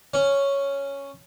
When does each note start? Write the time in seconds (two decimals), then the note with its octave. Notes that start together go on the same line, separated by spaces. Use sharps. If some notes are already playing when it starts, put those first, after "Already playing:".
0.14 C#4